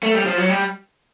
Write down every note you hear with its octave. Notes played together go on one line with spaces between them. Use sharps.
A3
G3
F3
F#3
G3